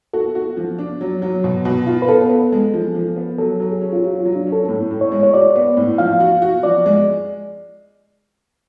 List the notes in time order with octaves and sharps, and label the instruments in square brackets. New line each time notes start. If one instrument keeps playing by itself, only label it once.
[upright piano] F#4 [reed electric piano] A4
[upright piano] F#4
F3
D4
F#3
F#3
B2
B2
F4
[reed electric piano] B4
[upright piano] B3 [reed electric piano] A4
[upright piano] B3
G#3
F3
F3
B3
[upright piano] F#3 [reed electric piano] A4
[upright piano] F#3
[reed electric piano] G#4
[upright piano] C#4
[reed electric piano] F4
[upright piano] F#3 [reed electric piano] F#4
[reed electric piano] F4
[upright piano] F#3
[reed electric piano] D4
[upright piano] C#4
[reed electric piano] A4
[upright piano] A2
A2
[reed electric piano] C#5
[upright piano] G#3
[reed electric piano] C#5
[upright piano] F#4 [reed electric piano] D5
[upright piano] B3
A2
[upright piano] F3 [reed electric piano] F5
[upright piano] F#4
F#4
[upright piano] F3 [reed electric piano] D5
[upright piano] G#3